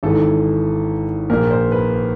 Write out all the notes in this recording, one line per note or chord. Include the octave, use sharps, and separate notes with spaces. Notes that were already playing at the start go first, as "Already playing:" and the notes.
G#1 G#2 E3 A4
A#1 A#2 A#4
C5
B4